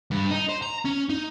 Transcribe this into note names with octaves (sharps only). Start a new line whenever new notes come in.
G2
D#4
C5
A#5
C#4
D#4